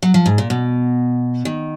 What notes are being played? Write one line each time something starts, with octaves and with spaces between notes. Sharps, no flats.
F#3
F3
G#2
A#2
B2
D#3